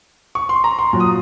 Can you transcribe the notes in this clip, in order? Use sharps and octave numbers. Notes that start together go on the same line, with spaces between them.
C#6
C6
A#5
C6
A#2 F#3
D#6